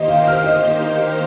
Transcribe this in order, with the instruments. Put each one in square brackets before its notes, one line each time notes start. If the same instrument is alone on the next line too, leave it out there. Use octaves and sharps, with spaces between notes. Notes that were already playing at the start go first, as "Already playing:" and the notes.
Already playing: [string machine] D#3 A#3 D#4 G4 C5 [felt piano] D#5
[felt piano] F5
F6
D#5